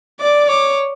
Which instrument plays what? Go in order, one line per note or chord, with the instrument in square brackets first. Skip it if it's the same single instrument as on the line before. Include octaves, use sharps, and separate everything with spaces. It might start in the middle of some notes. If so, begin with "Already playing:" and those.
[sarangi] D5 [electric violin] D6
[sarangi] C#5 [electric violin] D6